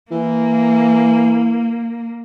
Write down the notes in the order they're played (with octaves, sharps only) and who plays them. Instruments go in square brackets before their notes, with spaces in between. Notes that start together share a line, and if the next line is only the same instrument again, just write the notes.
[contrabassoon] E3 [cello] A#3